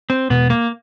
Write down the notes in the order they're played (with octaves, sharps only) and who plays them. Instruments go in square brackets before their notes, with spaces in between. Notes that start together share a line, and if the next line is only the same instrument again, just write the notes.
[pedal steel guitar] C4
[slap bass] E2 B2 G#3 [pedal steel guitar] B3
[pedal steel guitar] A#3